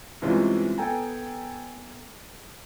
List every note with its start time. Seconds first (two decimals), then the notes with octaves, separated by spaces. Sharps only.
0.22 G2 C3 E3 G#3 C#4 F4
0.78 B3 A4 G5 G#5 A#5